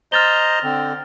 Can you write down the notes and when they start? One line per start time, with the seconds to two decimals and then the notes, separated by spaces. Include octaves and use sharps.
0.12 C5 D#5 A#5 F6 A6 G7
0.63 D3 C4